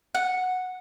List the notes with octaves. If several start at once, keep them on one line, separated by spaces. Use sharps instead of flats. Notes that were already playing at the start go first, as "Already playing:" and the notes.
F#5